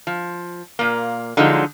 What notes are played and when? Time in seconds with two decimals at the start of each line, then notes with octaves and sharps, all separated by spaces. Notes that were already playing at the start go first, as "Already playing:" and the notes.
0.07 F3
0.79 A#2 A#3
1.37 D3 F3 F#3 G#3 D#4